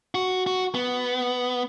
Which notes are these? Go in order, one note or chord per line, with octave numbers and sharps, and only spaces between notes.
F#4
F#4
B3